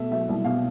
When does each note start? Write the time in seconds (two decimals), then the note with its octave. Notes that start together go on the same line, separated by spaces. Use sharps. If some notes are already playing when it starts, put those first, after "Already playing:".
Already playing: B2 A3 E5
0.11 F#3 E5
0.29 C2
0.44 B2 F5